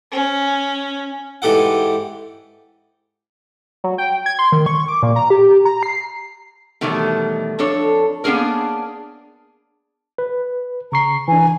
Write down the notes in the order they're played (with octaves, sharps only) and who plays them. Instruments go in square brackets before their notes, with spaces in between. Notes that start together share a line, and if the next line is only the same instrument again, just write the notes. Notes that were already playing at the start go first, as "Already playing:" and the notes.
[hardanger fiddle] C#4
[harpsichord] G#2 E3 G4 A4 F#5
[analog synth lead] F#3
G5
G#6
C6
D#3
C#6
D6
A#2
A#5
G4
A#5
C7
[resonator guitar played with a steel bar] B2 D#3 E3 F#3 G3 A3
F2 D4 A4 C#5
A#3 B3 C#4 D4 G#4 A#4
[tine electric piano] B4
[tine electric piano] C#3 C#6 C7 [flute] A#5
[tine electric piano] E3 D4 [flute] G#5